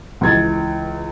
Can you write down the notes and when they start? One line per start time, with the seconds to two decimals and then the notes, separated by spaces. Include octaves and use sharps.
0.21 C#2 E3 G#6 A6